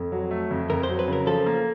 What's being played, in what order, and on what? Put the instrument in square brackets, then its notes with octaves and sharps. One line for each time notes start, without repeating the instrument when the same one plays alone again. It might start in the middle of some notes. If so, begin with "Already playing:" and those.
Already playing: [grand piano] F2 [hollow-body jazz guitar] A4
[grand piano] F#3
A3
F2
[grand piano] F2 [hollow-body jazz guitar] A#4
[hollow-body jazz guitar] C5
[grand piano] F#3
[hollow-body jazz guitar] B4
[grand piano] C#3 [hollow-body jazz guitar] A#4
[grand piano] F3 [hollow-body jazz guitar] A4
[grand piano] A#3